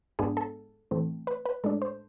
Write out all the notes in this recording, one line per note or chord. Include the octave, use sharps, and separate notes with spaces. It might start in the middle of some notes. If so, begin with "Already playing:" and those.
G#2 G#3 B3 D4 G#4
A4
A2 E3 A3 C4
B4
B4
A2 G#3 D4 A4
C5